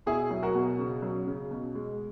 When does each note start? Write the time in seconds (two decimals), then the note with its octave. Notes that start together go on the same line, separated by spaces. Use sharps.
0.06 B2 E4 G#4
0.31 F#3
0.42 F#4 A#4
0.55 B2
0.79 C#3
1.02 F#3
1.27 C#3
1.51 B2
1.75 G#3